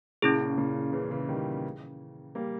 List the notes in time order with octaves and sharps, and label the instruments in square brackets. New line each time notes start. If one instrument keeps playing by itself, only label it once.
[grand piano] A#2 C#3 [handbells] C#4 E4 G#4
[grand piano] A#2 C#3
C#3 E3
C#3 E3
D#3 G3
G3 A#3